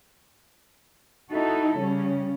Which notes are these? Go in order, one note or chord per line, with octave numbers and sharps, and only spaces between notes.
D#4 E4 F#4 A4
C#3 G3 C#4